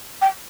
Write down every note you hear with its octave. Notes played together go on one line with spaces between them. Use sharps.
G5